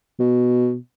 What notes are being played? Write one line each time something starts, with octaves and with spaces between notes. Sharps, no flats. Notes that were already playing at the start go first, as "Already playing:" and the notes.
B2